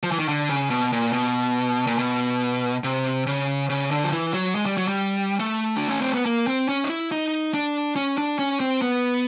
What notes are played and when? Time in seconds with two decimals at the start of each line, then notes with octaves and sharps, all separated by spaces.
0.03 F3
0.12 E3
0.19 D#3
0.28 D3
0.49 C#3
0.70 B2
0.93 A#2
1.13 B2
1.87 A#2
1.99 B2
2.84 C3
3.27 C#3
3.70 C#3
3.91 D3
4.04 F3
4.12 E3
4.34 F#3
4.55 G#3
4.66 G3
4.77 F#3
4.88 G3
5.40 A3
5.77 D4
5.89 C#4
6.01 C4
6.14 B3
6.26 A#3
6.47 C4
6.69 C#4
6.84 D#4
6.89 E4
7.12 D#4
7.54 D4
7.96 C#4
8.18 D4
8.39 C#4
8.60 C4
8.82 B3